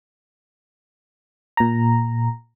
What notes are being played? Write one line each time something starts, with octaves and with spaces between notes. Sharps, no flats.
A#2 A#5